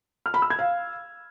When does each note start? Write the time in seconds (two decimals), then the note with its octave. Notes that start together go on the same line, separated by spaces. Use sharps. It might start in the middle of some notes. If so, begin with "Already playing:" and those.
0.26 F6
0.34 B5
0.42 E6
0.50 G#6
0.59 F5